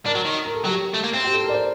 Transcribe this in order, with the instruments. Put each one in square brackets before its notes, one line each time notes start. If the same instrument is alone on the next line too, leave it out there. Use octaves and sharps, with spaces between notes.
[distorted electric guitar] D4 [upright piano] A#4
[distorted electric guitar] F#3
D#3
[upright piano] A#4
A4
[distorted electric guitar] F#3 [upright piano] G4
[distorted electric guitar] A3
A#3
C4
[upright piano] G4
A4
A#4
D5
C5